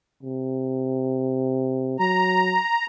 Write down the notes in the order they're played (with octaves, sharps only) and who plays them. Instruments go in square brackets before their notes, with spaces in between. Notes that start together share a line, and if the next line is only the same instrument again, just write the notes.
[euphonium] C3
[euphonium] F#3 [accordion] A#5